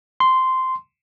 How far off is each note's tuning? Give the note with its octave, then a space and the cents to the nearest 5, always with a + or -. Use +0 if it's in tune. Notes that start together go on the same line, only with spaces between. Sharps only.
C6 -10